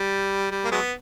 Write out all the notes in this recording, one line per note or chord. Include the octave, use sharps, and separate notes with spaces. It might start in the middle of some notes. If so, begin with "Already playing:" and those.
Already playing: G3
G3
A#3
F#3 G#3 B3